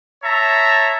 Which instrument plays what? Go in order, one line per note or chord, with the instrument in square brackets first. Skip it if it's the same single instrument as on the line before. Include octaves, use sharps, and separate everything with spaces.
[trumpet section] C#5 E5 A5 A#5